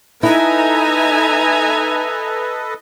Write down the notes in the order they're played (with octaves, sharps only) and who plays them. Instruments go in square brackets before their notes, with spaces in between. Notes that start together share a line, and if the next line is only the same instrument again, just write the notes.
[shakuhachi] D#4 [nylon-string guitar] E4 [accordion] A4 B4 D#5 [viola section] E5 G#5 A#5